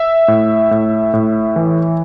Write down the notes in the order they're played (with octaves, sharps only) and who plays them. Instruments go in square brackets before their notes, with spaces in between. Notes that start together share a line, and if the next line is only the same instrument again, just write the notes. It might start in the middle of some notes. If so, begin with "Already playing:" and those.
Already playing: [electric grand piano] E5
A2
A2
A2
E3